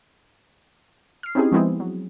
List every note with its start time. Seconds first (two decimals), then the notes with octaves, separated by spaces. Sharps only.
1.23 F6 C7
1.35 C4 C#4 D#4 E4 G4 G#4
1.52 F3 G#3 B3 C4 E4 G#4
1.80 F#3